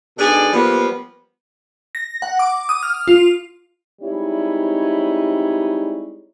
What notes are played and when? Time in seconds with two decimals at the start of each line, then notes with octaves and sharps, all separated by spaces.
0.18 G#2 B2 D4 G#4 A4 D5
0.53 F3 G3 A#3 B3 B4
1.95 A#6
2.22 F#5
2.39 D6
2.69 D#6
2.83 F6
3.08 F4
4.02 G3 G#3 C4 D#4 E4 C#5